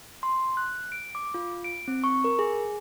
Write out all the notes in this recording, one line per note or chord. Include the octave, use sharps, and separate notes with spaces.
C6
F#6
D7
D6
F4
D7
C4
C#6
A#4
G#4